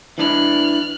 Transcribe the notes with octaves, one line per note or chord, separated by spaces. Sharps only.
E3 D4 E4 F6 F#6